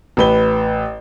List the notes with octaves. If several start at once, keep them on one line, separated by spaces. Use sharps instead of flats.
A1 B4 G7